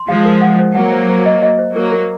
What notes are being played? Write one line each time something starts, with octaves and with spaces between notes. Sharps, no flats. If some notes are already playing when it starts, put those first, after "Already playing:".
Already playing: C6
F3 G#3 F5
A#4
F#5
C5
F#3 A#3 F#5
C5
C5
D#5
D#5
C5
F#3 A#3 A#4
A#4